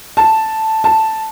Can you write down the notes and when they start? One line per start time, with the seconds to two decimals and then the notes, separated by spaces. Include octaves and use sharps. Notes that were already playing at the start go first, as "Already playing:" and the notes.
0.17 A5
0.84 A5